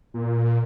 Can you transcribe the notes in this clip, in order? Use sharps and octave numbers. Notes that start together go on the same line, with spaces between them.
A#2